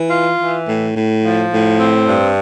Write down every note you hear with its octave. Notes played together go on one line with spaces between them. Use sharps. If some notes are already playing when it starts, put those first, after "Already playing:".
Already playing: E3
F4
E3
A2
A2
F3
A2
C4
G2